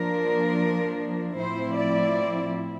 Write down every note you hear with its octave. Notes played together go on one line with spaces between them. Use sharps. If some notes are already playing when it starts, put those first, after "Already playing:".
Already playing: F3 A#3 D4 A#4
A2 F3 C4 E4 C5
D5